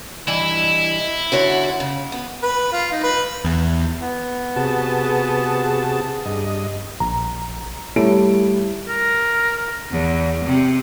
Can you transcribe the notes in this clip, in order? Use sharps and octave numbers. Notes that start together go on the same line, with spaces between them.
G2 E3 E4 D#5
D3 F#4 C#5
C#3
B3
B4
F4
D#4
B4
E2
B3
C3 F#4 G#4 A5
G2 D#5
A#1 A#5
G3 A3 E4 A4 C#5 D7
A#4
A#4
E2
C3